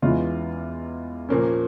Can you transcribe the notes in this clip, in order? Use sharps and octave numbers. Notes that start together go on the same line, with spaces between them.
E2 E3 G#3 C#4 F4
A#2 F3 A#3 C#4